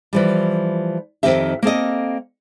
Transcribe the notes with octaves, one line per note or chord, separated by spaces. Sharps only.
E3 F3 G3
F2 C3 D#3 C4 G4 E5
A#3 C4 A4 D#5